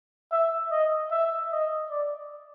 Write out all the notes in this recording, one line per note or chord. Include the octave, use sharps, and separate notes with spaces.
E5
D#5
E5
D#5
D5